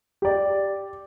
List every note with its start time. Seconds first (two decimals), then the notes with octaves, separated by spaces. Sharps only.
0.22 G4 D5